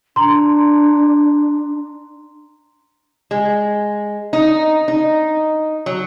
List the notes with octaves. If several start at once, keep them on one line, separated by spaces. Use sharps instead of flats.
D4 A#5 C6
G#3
D#4
D#4
F#3